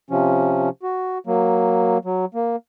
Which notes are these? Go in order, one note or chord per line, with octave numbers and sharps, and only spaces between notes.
C3 F3 C#4
F#4
F#3 A#3
F#3
A#3